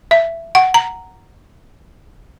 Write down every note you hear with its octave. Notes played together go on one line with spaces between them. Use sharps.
E5
F#5
A#5